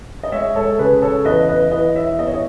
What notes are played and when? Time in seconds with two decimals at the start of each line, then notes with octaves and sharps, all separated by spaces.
0.23 D#5
0.32 G#3 C#5 E5
0.55 A4 C#5
0.78 C#3 G#4 B4
1.02 A4 C#5
1.25 E2 B4 D#5
1.49 B4 D#5
1.71 E3 B4 D#5
1.96 C#5 E5
2.19 B3 D#5
2.26 C#5
2.33 D#5